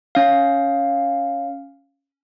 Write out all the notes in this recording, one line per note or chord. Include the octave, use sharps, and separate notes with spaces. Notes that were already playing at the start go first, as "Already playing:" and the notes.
C#4 F5